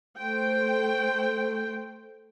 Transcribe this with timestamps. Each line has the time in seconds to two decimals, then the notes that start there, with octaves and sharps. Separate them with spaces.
0.17 A3 C5 G5